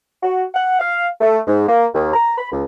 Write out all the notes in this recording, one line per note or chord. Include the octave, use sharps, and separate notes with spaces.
F#4
F#5
F5
A3
G#2
A#3
D#2
A#5
B5
C#2